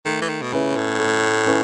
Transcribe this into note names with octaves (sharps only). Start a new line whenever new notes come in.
D#3 A3
E3
D#3
B2
C#3 C#4 E4 B4
A2
A3
C#4 E4 B4